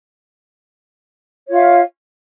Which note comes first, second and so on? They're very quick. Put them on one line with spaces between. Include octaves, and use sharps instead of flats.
C#5 F4 F5 E5